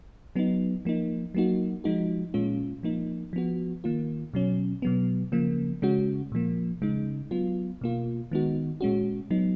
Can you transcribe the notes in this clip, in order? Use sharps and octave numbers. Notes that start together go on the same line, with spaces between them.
F#3 B3 D#4
F3 A#3 D#4
F#3 A#3 D#4 F#4
F3 G#3 D#4 F#4
A#2 G#3 C#4 F4
F3 A#3 D#4
F3 B3 F#4
D#3 A#3 F4
B2 F#3 C#4
B2 F#3 B3
C#3 F3 A#3
C#3 G#3 C#4 F#4
A#2 F3 A#3
C#3 G#3 D#4
F#3 B3 F4
B2 A#3 F4
D#3 G#3 B3 D#4 F#4
A#2 G#3 C#4 F#4
F#3 B3 D#4